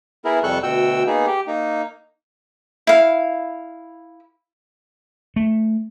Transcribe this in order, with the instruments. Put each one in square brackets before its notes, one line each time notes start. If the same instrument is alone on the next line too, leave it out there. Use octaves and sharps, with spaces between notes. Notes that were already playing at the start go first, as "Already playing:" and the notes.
[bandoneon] B3 E4 G#4 A#4
F2 C3 G3 A4 C#6 F#6
D2 B2 F#4 G5 E6
A#3 B3 D#4 G#4
G4
A#3 D#4
[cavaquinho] E4 F5
[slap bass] A3